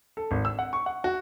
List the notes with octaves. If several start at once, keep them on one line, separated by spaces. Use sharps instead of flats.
A4
G#1
E6
F#5
C#6
F#5
F#4